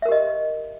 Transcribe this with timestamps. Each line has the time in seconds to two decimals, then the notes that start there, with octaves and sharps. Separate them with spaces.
0.02 E5
0.05 A#4
0.09 G4
0.12 D#5